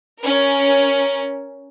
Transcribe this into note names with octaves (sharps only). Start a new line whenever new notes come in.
C#4 A#4